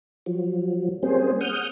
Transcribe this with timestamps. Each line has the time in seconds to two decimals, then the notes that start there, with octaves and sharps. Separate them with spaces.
0.26 F3 F#3
1.03 G3 A#3 C4 C#4 G#4 C5
1.41 F#5 D#6 F6 G6